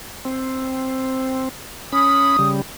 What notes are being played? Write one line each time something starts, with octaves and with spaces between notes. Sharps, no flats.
C4
C#4 B5 D#6
C#3 G3